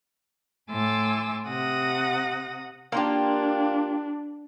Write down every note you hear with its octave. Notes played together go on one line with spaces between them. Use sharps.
A2 G#5 C6 D6 E6 A6
C3 F#5 D#6 A#6
A#3 D4 F4 G4